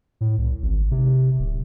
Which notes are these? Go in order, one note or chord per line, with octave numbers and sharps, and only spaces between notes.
A2
C2
G#1
C3
D1